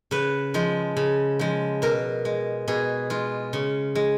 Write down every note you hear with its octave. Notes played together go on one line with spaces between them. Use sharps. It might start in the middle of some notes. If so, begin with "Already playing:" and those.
C#3 B4
F3 G#3
C#3
F3 G#3
B2 A#4
G#3
B2 G#4
G#3 F4
C#3
G#3